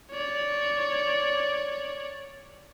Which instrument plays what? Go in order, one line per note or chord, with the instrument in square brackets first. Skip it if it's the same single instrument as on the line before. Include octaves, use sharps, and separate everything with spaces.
[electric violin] C#5 D5